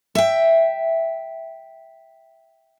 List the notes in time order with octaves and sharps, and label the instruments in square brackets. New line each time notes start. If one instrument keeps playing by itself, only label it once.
[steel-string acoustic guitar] E5 G5